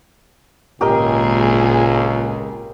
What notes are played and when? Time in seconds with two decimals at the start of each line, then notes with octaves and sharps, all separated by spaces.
0.81 G#1 C#2 A#2 G4 G#4 A#4 D#5